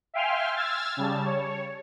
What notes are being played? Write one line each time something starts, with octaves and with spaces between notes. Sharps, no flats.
E5 F5 G5 G#5 C6 F6
E6 F6 G#6 A6
C#3 G3 A5
C#5